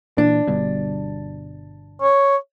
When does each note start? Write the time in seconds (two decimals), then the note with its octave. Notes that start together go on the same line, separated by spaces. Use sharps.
0.18 A#2 E3 D4
0.48 G1 G2 B2
2.02 C#5